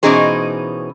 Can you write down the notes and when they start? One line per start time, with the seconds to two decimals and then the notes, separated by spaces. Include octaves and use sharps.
0.03 B2 E3 C#4 D#4 G#4 C5